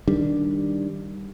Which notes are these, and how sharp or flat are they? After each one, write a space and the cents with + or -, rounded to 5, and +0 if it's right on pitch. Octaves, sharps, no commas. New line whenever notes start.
D#3 +0 G3 +0 D4 +0